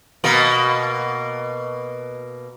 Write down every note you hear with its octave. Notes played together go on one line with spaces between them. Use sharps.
B2 A#3